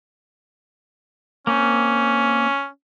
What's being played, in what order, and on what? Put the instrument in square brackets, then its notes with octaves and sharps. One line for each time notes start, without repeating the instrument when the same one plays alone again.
[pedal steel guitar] A#3 C4 [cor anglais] C#4